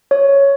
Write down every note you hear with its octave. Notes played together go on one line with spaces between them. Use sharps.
C#5